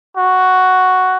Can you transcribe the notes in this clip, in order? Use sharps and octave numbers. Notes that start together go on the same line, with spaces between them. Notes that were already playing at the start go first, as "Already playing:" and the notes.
F#4